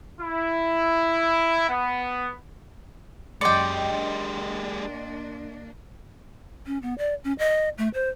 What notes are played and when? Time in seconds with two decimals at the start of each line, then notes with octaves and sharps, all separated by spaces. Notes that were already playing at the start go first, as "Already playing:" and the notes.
0.21 E4
1.69 B3
3.41 F#2 G#3 G4 D5 D#5 G5 C6 C#7
3.92 A#3 D4
6.65 C#4
6.82 B3
6.98 D5
7.24 C#4
7.39 D#5
7.78 A3
7.94 C5